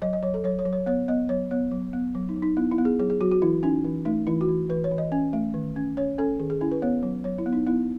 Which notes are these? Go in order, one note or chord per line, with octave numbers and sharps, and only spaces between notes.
F#3 D#5
D#5
F#3 C#5
A4
F#3 C#5
C#5
F#3
C#5
B3 C#5
B3 D#5
F#3 C#5
B3 C#5
F#3
B3
F#3
D#4
F#3
D#4
B3 E4
E4
B3
G#4
F#3 G#4
G#4
F#3 F#4
F#4
E3 E4
C#4 D#4
E3
A3 D#4
E3 E4
F#4
E3
E3 B4
C#5
E3
D#5
C#4
A3
D#3
C#4
C#4 C#5
C#4 A4
D#3 G#4
G#4
C#4 E4
B4
B3 C#5
F#3
F#3 C#5
E4
B3
D#4
B3 E4